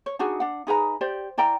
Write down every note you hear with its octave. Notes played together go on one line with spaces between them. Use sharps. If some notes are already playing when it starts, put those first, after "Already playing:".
C#5
D4 D#4 F#4 G#4
D4 F#5
D#4 G#4 B4 A#5
G4 C5 D5
E4 D5 G5 A#5